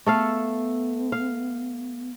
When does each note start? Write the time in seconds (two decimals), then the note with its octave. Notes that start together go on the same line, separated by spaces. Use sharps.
0.06 A3 B3 A4 F5
1.12 F5